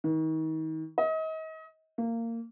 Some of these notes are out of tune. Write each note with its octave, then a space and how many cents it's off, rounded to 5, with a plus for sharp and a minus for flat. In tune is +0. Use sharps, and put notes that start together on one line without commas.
D#3 +35
D#5 +35
A#3 -20